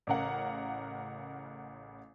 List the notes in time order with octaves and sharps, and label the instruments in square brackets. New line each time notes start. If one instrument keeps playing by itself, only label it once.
[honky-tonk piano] A1 C#3 A#4 F5 F#5